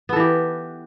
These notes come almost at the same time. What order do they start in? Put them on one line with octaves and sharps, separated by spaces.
B3 A4 E3 G4